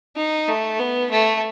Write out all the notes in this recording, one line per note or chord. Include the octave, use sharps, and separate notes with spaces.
D#4
A3
B3
A3